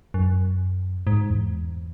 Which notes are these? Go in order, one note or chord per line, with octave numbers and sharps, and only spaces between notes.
F#2
G#2
E2